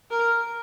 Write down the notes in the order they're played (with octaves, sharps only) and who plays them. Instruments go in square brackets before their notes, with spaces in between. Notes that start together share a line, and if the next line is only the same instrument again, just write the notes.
[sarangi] A#4